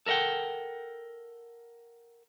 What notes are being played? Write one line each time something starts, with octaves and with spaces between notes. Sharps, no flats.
A4 A#4 D#5 F#5 G5